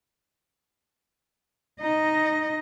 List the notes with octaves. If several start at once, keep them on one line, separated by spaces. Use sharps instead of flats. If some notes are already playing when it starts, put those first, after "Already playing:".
D#4 D#5